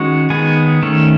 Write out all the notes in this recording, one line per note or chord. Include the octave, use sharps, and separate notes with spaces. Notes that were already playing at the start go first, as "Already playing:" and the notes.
Already playing: D#3 G#3 C#4 F#4 F#5
D#3 G#3 B3 G#4 G#5
D#3 A3 C#4